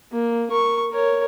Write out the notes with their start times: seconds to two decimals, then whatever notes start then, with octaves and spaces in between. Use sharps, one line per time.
0.12 A#3
0.51 A#4 C#6
0.91 A#4 C#5